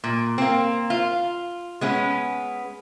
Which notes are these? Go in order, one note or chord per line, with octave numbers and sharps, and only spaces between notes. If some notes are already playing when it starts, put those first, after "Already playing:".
A#2
A#3 C4
F4
G#3 B3 C#4